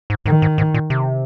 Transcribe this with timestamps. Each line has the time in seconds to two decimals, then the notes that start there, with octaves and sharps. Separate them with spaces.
0.10 G#2
0.26 G#2 D#3
0.42 G#2
0.58 G#2
0.74 A#2
0.90 C3